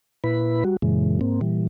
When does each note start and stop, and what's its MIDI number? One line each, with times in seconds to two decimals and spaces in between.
0.24 0.64 46
0.24 0.64 64
0.24 0.64 71
0.24 0.64 83
0.64 0.77 55
0.64 0.77 66
0.82 1.19 42
0.82 1.19 46
0.82 1.19 49
0.82 1.19 52
0.82 1.19 56
1.21 1.41 44
1.21 1.41 58
1.21 1.41 60
1.41 1.67 46
1.41 1.67 52
1.41 1.67 55